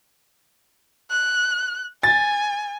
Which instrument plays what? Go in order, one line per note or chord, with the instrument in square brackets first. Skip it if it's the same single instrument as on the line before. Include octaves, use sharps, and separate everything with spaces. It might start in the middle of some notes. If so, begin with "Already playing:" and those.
[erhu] F#6
[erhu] G#5 [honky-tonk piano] A6